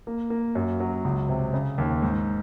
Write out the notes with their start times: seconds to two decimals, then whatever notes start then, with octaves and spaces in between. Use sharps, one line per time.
0.07 A#3
0.30 A#3
0.55 F#2
0.80 F#3
1.05 C#2
1.29 C3
1.54 C#3
1.78 D#2
2.02 G#2